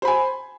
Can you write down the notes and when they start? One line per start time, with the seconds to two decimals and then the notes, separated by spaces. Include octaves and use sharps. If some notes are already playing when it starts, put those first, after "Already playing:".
0.02 C5
0.05 B5
0.08 G#5